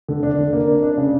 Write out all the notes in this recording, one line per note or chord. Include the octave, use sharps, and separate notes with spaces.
D3
D4
D3
A#3
D4
D4
C#3